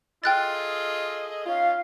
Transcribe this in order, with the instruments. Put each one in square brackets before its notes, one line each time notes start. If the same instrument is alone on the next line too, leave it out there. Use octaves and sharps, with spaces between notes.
[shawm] F4 [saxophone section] G#4 A4 D#5 [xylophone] G5 F#6 A6
[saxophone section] C#4 D#4 F4 [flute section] F5